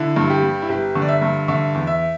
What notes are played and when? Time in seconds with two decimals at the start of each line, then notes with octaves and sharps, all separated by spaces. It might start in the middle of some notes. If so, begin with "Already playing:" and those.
Already playing: D3 E4
0.16 G2
0.30 G4
0.42 G3
0.62 E4
0.69 G1 G4
0.95 D3
1.02 D5
1.08 E5
1.22 G2
1.48 D3 E5
1.74 E2
1.87 E5